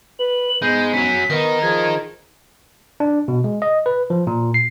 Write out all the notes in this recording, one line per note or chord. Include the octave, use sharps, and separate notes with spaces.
B4 F#7
G#2 G#3 B3 G6
F#3 C#4 B6
D#3 B3 D#4 A#4
F3 G#4 G#6
D4
B2
G#3
D#5
B4
F3
A#2
C7